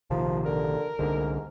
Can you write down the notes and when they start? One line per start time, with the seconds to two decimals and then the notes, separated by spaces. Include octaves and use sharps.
0.10 A#1 C3 D#3 F3
0.45 D3 A#4
0.99 C2 G#2 D3